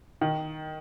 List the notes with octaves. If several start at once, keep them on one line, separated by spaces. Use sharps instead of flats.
D#3